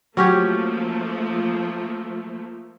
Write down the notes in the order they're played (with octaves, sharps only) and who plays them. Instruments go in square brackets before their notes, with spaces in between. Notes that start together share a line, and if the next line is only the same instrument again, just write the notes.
[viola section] F3 A3 A#3 [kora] F#3 C#4 G4